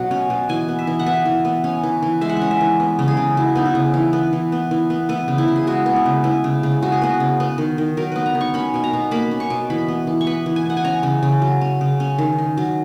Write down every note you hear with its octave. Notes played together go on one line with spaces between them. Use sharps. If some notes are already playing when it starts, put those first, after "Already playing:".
Already playing: B2 F#3 F#5
C#4
B2
E3 G#5
B3
E5
E3
F#5
B3 E5
E3
B3
C#4
E3
E3
G#3 E5
F#5
C#4 E5
E5
E3
B3
C#3
G#4
C#3
F#3 E4
B3 D#4
E4
C#3
E3
B3
E3
B3
E3
B3
B3 E4
C#3
E4
C#3
G#4
G#3 F#4
B3
E4
C#3
B3 E4
C#3
C#3
G#3 F#4
G#4
B3 F#4
C#3
B3
D#3
D#3
F#3 A#4
B3 B4
A#5
D#3
C#6
C#4 B5
B2 G#5
A#5
B2
A#3 B5
C#4
C#6
B2
E3 B5
B3
E3
C#6
B3 B5
E3
G#5
B3 F#5
G#5
C#4 A#5
C#3
C#3
F#3
C#4
C#3
C#4
D#3
D#3
F#3